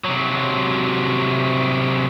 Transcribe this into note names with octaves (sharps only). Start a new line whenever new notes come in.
C3 F#3